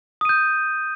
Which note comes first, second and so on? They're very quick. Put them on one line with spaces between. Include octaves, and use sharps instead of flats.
D#6 D#7 G6